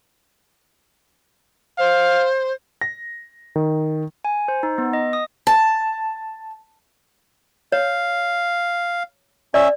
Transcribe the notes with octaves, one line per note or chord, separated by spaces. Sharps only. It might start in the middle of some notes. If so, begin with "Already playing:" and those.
C5 F5
A#6
D#3
G#5
C5
D#4
B3
D#5
D#6
A5
C#5 F5
C#4 D5 E5